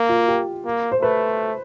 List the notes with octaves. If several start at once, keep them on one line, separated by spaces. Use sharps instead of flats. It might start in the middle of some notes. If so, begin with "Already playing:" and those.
Already playing: A#3
F4
G4
A#3
C5
A3 B4